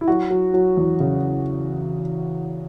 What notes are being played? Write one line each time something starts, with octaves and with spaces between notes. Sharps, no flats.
E4
F#3 F#4
F#3
F#3
E2
C#3